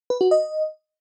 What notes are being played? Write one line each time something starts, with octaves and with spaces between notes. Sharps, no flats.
B4
F#4
D#5